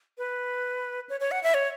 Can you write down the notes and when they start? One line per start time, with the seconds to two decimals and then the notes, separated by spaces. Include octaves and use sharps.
0.18 B4
1.09 C#5
1.20 C#5
1.31 F#5
1.43 E5
1.54 C#5